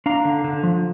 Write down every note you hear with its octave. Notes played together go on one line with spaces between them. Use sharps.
D4 F5 A#5
D3
D3
F3